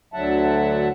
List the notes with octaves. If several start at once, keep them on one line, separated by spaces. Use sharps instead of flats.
D2 D3 F#3 E5 F#5 A5